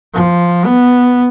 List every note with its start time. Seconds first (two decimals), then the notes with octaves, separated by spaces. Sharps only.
0.14 F3
0.65 B3